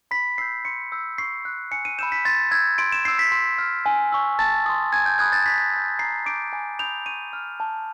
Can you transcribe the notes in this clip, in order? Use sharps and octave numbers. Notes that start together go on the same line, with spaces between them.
B5 B6
E6 G6 C7
C6 C#7
E6 G6
C#6 C7
F#6
G#5 C#7
D#7
B5 E6 G6 E7
B6
C6 A6
E6 G6 G#6
C6 D7
E7
E6 G6 C7
B6
C6
F6
G#5
C#6 E6
A5 A6
C6 D#6
G#5 G#6
G6
B5 D#6 F#6 G#6
A6
C#6 B6
E6 G6
A#5 C7
D6 G6 D7
G#5
B5 D#6 G6 F7
C#6 D#7
F6
A5